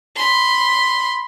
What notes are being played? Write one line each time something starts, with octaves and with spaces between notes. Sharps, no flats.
B5 C6